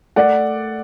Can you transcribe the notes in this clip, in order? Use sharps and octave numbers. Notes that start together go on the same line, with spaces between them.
A3 D5 F#5